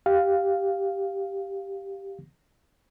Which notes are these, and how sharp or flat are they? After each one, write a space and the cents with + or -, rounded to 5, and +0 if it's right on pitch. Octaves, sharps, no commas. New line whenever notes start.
G4 +0 F5 +0